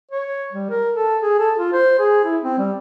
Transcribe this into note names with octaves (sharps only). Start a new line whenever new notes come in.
C#5
G3
A#4
A4
G#4
A4
F4
C5
G#4
E4
C4
G3